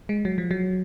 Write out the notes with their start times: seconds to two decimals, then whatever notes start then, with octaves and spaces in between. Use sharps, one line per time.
0.09 G#3
0.25 F#3
0.38 F3
0.51 F#3